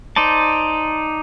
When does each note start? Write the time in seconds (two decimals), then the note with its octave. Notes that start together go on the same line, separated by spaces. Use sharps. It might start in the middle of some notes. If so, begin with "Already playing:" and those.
0.16 D#4 C5 D5 A5